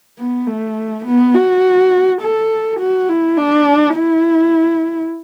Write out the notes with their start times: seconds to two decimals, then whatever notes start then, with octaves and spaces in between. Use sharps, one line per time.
0.18 B3
0.47 A3
1.05 B3
1.34 F#4
2.21 A4
2.80 F#4
3.09 E4
3.37 D4
3.95 E4